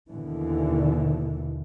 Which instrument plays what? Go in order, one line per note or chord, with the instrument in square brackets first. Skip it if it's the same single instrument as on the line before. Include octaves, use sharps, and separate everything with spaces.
[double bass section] D#2 B2 D3 E3